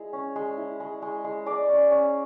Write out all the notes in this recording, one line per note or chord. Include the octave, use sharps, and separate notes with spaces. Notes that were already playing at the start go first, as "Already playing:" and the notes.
Already playing: G#3 E4
C#4
G#3
E4
G#3
G#3
G#3
G#3 D5
C#4
C#4